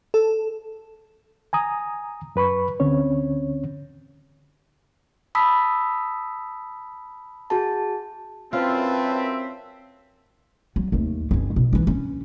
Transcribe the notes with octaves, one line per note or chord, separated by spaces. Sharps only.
A4
G#5 A#5 D#6
F#2 B4 B5 C#6
D2 D3 C4 C#4 C#5
A5 B5 D#6 E6 B6
F#4 G#4 A5
F#2 C4 F4 B4 E5 A5
F#3
D#2 A3
G1 C#4
B2
E3 D4
C#4